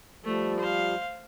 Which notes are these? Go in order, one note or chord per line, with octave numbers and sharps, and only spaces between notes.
F3 G3 A3
C5 F5